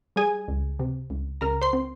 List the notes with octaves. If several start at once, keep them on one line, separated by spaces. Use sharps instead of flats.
G3 G#4 G#5
C#2
C3
C#2
C#2 A#4 A#5
C5 C6
C4